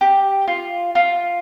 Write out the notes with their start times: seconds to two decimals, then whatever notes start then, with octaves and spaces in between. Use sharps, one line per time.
0.01 G4
0.48 F4
0.95 F4